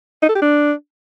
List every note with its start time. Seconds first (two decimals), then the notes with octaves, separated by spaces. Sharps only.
0.22 D#4
0.29 A4
0.35 G4
0.42 D4